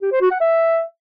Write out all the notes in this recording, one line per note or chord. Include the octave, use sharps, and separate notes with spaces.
G4
C5
F#4
F#5
E5